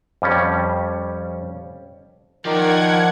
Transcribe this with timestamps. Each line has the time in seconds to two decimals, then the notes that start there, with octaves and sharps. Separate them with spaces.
0.22 F2 G3 C#4
2.45 D#3 F3 A#4 D5 F#5 G#6